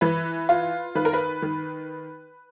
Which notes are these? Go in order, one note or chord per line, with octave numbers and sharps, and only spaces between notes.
E3 B4
F4
D#3 B4
A#4
B4
D#3